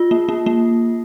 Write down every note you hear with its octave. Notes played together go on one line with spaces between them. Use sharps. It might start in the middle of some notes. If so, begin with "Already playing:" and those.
Already playing: F4
A#3
A#3
A#3